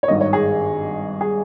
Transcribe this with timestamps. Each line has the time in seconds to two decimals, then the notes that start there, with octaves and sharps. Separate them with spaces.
0.03 C#5
0.08 G#1 G2 D#3 D#5
0.21 C#5
0.33 G#4
1.21 G#4